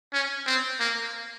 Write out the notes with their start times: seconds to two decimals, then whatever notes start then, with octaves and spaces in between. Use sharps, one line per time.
0.13 C#4
0.46 C4
0.80 A#3